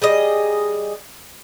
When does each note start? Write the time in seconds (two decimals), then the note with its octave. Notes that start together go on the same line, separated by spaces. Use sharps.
0.02 G3 G#4 D#5